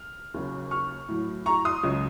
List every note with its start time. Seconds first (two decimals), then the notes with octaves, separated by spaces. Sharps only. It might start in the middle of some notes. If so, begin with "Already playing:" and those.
Already playing: F6
0.34 D#2 C#3 F#3
0.71 C#6 F6
1.09 A2 F#3
1.46 A#5 C#6
1.65 C6 D#6
1.83 C#2 C#3 F#3